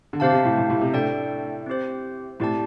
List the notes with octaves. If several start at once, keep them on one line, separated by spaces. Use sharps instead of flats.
D3
C3 C4 G4 C5 F5 A5
C3
A2
A2
A2
C3
A2 D4 A4 D5 G5
C4 G4 C5
A2 C4 G4 D5 A5